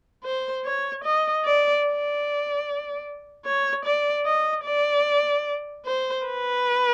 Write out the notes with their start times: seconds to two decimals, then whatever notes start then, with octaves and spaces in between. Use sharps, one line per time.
0.24 C5
0.65 C#5
1.04 D#5
1.45 D5
1.85 D5
3.45 C#5
3.85 D5
4.26 D#5
4.65 D5
5.86 C5
6.26 B4